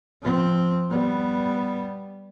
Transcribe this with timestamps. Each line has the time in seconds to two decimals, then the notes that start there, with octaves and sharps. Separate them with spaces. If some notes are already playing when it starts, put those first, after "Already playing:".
0.22 F3 C4
0.90 G3 B3